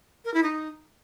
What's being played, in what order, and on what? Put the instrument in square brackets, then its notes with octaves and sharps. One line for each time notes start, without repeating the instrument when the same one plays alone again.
[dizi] A#4
E4
D#4